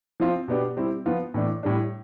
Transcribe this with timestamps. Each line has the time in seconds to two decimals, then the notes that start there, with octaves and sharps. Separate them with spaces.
0.20 F3 C4 F4
0.48 B2 B3 D4 G4
0.77 G3 C4 E4 G4
1.06 F3 B3 F4
1.34 A2 E3 A3 D4
1.63 A2 G3 D4